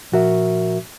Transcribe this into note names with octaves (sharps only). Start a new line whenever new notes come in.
A#2 F3 F#4 A#4 E5